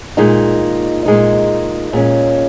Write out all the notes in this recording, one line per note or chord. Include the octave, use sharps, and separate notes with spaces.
A#2 G#3 D#4
A#2 G#3 D#4
A#2 G#3 C#4